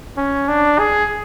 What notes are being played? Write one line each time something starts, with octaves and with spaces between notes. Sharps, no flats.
C#4
D4
G#4